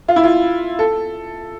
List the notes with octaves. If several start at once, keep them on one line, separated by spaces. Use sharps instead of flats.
F4
E4
F4
A4